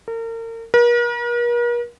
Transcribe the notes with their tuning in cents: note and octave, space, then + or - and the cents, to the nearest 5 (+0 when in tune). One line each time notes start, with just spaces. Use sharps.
A#4 -35
A#4 +45